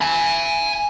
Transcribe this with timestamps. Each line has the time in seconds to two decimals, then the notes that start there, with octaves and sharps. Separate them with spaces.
0.01 G#5 B5